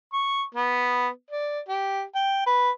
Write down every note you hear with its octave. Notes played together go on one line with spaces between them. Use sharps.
C#6
B3
D5
G4
G5
B4